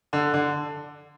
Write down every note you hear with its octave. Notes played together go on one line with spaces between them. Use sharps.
D3
D3